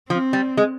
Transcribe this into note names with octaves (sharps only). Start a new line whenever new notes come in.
F3 C4
G3
G#3